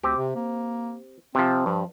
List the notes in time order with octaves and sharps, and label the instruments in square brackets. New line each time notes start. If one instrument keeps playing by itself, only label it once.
[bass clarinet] D2 [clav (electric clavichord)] C4 G4
[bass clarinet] C3
A#3
[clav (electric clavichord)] C3 F3 [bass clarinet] C4
[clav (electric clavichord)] G2 [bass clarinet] F3